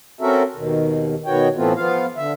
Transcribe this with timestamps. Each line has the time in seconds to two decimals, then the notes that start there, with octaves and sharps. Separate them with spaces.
0.21 C4 C#4 F#4 A4 A#4 E5
0.56 D#2 B2 D#3
1.26 B2 D#3 B3 F#4 C#5 G5
1.56 A2 E3 A3 B3 C4 F4
1.76 F3 B3 F4 F5
2.17 D3 E5